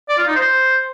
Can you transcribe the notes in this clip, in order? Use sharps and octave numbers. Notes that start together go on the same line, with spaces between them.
D5
F4
D#4
C5